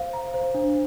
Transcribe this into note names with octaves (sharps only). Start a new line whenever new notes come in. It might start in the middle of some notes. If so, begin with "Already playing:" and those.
Already playing: C5 F5
A#5
C5
D4